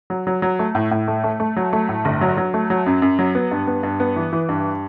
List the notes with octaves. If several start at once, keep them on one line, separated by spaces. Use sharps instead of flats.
F#3
F#3
F#3
A3
A2
A2
A3
A3
A3
F#3
A3
A2
G1
F#3
F#3
A3
F#3
F#2
F#2
F#3
B3
G2
B3
G2
B3
E3
E3
G2